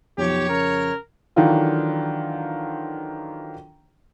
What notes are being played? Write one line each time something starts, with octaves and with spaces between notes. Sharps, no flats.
B1 F2 F3 G4 C#5
C#3 A#4
D#3 E3 F#3 D4 F4 A4